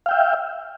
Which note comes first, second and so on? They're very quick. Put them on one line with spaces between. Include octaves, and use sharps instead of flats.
F5 G5 E5